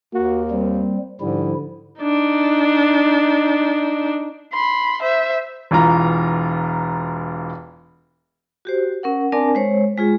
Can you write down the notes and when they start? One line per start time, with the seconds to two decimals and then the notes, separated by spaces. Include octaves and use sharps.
0.14 D#2 A#3 F#4
0.51 G3 C4
1.21 G#2 D3 F3 G3 E4
2.01 D4 D#4
4.52 B5 C6
5.02 C5 E5
5.71 E1 E3 F4 A#5
8.65 F#4 G4 C5
9.03 C#4 A#4 F#5
9.32 C4 D4 A#4 D5 G#5 A5
9.55 G#3 C5 C#5
9.97 G#3 F4 G#4